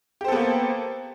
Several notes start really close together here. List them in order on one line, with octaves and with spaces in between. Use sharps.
G4 C5 A4 B3 A#3